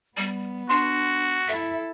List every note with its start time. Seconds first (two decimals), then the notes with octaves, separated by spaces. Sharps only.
0.17 G3 B3
0.69 D4 F#4 C6
1.48 E4 A4 E5